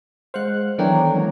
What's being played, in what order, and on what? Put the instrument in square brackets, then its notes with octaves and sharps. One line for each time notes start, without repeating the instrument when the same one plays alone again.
[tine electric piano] G#3 C5 [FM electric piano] F5 F#5 F#6
[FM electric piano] D#3 E3 D4 [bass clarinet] F#3 [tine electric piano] B3 A4 G5
[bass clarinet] F#3 [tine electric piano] G#3 A#3 C#4